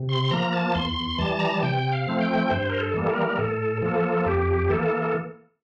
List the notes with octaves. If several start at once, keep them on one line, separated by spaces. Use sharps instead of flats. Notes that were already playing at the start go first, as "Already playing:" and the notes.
Already playing: C3
C6
F3 A#3 A#5
A5
E2 C6
E3 G3 A5
A#5
A5
C3 G5
F5
F3 A3 C4
G5
G2 C5
A#4
A4
E3 G3 A#3
A#4
A2 A4
F3 A#3 A4
F2 G4
E3 A#3 A4
A4